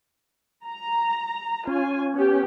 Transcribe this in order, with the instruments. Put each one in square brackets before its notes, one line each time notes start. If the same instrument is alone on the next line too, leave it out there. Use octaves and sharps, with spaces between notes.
[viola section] A#5
[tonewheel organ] C#4 [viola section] F4 G#5
[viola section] B3 G4